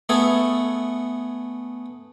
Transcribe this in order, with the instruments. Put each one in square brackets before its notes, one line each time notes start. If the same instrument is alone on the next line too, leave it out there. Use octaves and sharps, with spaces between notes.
[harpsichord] A3 B3 G#4 A4